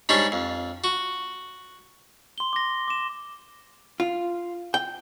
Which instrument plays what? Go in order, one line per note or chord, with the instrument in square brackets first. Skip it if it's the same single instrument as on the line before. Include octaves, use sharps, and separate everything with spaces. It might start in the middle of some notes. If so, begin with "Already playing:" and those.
[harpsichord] G#2 G3 C#4 D4 G4
F2
F#4
[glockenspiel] C6 G7
D6 A#6
D6 E7
[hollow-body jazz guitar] F4
G5